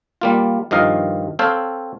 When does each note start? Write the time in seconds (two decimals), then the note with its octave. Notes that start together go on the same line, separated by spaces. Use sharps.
0.21 G3 A#3 F4
0.71 G2 D#3 F3 D#5 F5 A#5
1.39 C4 A4 C#5 F5 G5